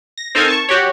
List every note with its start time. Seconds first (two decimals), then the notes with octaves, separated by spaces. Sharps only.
0.18 A#6
0.35 C4 D#4 A4 A#4 F5 G#5
0.48 A5 C#6
0.69 F#4 G4 C#5